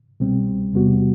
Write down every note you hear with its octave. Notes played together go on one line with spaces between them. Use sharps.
C2 B2 G3 C4
E2 C3 G3 B3 F#4